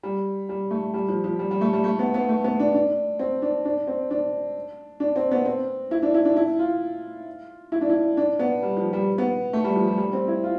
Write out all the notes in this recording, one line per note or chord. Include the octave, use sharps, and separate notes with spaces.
G3
G3
A3
G3
F3
F3
G3
G3
A3
G3
A3
B3
B3
A3
B3
D4
D4
C4
D4
D4
C4
D4
D4
C4
B3
C4
E4
D4
E4
D4
E4
F4
E4
D4
E4
D4
B3
G3
F3
G3
B3
A3
G3
F3
G3
G3
C4
E4
F4